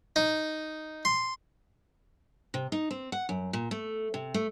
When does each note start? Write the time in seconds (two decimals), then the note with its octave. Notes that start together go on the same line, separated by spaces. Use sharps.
0.16 D#4
1.05 C6
2.54 C3
2.72 D#4
2.91 C4
3.12 F#5
3.29 F#2
3.53 A#2
3.71 A3
4.14 C3
4.34 A3